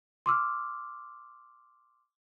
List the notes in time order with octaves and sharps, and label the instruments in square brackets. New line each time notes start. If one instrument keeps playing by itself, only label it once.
[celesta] C6 D6 E6 F6